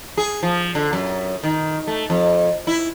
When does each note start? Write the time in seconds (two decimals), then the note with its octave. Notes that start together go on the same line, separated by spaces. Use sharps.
0.17 G#4
0.43 F3
0.75 D3
0.93 F#2
1.43 D#3
1.87 A3
2.10 F2
2.67 E4